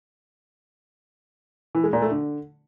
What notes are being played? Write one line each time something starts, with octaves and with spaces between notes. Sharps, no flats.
E3
G#3
A#2
A3
D3